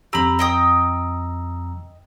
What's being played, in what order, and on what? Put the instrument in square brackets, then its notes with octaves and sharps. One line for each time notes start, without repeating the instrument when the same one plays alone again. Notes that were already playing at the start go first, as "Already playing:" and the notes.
[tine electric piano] F2 A#5 E6 [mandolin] G4 B5
[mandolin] D#5 G5 D#6